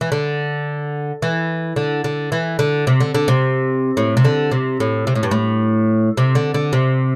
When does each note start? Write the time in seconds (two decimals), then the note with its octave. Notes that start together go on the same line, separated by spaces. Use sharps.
0.01 E3
0.12 D3
1.22 E3
1.76 D3
2.04 D3
2.32 E3
2.59 D3
2.87 C3
3.00 D3
3.15 D3
3.28 C3
3.97 A2
4.17 C3
4.25 D3
4.52 C3
4.80 A2
5.07 C3
5.15 A2
5.23 G2
5.31 A2
6.17 C3
6.35 D3
6.54 D3
6.73 C3